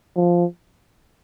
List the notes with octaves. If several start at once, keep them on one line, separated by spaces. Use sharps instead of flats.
F3